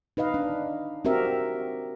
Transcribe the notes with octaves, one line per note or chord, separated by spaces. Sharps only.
D#4 B4 D#5 F5
D4
C4 F#4 G4 A#4 E5